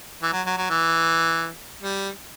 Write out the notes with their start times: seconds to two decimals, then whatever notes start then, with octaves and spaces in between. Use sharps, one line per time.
0.23 E3
0.33 F#3
0.46 F#3
0.58 F#3
0.70 E3
1.83 G3